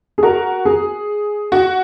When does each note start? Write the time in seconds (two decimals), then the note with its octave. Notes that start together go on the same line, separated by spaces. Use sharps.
0.18 G#4
0.23 F#4 A#4
0.65 G#4
1.52 F#4